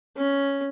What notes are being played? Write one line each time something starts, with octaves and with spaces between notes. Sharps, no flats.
C#4